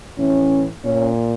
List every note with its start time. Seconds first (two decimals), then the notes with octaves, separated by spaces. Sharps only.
0.18 A2 E3 C#4
0.84 A#2 C#4